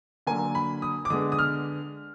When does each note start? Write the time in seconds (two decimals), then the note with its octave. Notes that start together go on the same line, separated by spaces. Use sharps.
0.27 D3 F#3 A#3 G#5
0.55 B5
0.82 D#6
1.05 D6
1.10 D3 G#3 B3 D#6
1.32 D#6
1.39 F6